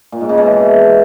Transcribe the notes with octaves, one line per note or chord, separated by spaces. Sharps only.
A#2
G#2
C#3
B2
E3